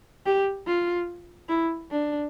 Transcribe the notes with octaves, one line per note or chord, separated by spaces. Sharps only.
G4
F4
E4
D4